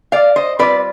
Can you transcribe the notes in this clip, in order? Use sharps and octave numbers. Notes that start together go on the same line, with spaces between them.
D5 F5
C5 D#5
G3 C4 F4 B4 D5